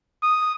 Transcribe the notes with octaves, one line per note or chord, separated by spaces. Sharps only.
D#6